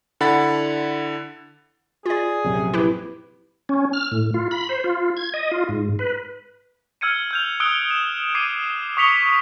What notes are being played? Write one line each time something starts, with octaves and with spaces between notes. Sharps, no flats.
D3 E4 F#5 B5 A6
F4 G#4 D5
A#1 F#2 C3
E4 G4 B4
C#4
F6
A2
F4
B5
C5
F4
G#6
D#5
F4
G#2
B4
E6 F6 G#6 C#7 D#7
F6 G6 F7
D#6 E6 F#6 D7 G7
E7
D6 G#6 C7 D7 D#7
C#6 D#6 B6 C#7 F7 G7